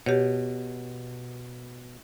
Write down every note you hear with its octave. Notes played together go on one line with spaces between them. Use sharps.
B2 G4 C#5